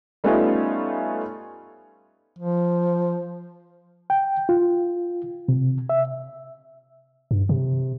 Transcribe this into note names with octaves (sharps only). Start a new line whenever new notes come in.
G3 A3 B3 C#4 D#4 F4
F3
G5
F4
C3
E5
G2
C3